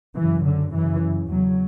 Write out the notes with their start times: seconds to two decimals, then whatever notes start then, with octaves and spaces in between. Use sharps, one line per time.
0.16 F#2 C#3 E3
0.45 D3
0.73 F#2 C#3 E3
1.30 E2 C#3 F#3